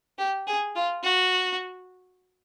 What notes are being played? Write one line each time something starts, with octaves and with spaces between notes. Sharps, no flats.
G4
G#4
F4
F#4